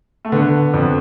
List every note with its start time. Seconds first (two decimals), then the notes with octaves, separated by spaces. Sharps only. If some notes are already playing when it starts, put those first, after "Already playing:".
0.25 A3
0.32 D3 B3
0.74 F2